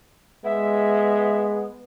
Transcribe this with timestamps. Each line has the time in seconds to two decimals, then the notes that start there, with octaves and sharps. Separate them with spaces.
0.44 G#3 B3 E5